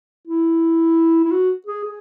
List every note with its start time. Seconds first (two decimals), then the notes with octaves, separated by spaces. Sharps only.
0.27 E4
1.25 E4
1.32 F#4
1.67 G#4
1.84 G#4